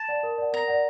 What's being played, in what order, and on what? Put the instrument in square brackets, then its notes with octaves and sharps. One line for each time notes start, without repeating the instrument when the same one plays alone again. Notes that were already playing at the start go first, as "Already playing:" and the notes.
Already playing: [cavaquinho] A5
[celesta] D5 F#5
A#4
D5 F#5
[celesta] A#4 [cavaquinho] A#5
[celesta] D5 F#5